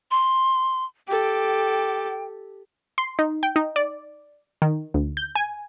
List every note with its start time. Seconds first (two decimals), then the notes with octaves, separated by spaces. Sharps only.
0.11 C6
1.08 G4 A4 G5
2.98 C6
3.19 D#4
3.43 G5
3.56 D#4
3.76 D5
4.62 D#3
4.94 D2
5.17 G6
5.35 G#5